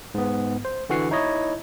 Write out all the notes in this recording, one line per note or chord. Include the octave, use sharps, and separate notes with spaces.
G#2 B3
C5
D3 E3 F#4 F#5 C7
D#4 E4 C#5 D#5